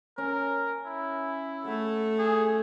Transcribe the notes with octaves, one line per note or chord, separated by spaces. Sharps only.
C#4 A#4
E4
A3 F#4 A4
G#4